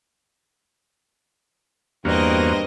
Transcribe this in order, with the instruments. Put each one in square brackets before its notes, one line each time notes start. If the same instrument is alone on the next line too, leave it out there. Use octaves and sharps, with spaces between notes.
[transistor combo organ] E2 A#3 F#4 [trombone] G2 [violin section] C4 A#4 D#5